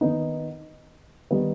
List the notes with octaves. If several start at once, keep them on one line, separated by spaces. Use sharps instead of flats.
D#3 B3 D#4
D#3 G3 B3 D#4